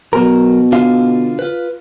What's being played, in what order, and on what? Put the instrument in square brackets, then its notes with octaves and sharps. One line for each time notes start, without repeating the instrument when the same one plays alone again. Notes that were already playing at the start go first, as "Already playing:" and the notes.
[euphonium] B2 [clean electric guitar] F#3 A#4
[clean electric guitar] D3 F4 F5
F4 B4